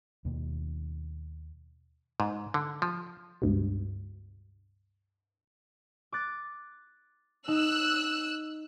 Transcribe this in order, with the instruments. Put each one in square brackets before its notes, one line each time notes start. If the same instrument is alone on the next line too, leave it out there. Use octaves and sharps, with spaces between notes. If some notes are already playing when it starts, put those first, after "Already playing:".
[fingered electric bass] D#2 B2 D#3 A#3
[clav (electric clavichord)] G#2
D3
F3
[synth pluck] C#2 G2 B2
[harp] D6 F#6 A6
[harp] D#4 [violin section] E6 F#6